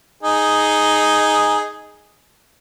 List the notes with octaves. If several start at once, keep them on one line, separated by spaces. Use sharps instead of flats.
D#4 G#4